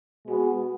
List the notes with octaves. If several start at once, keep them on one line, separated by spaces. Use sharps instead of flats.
B2 G#3 B3 F#4